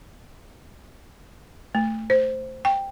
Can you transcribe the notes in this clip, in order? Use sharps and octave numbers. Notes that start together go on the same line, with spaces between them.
A3
C5
G5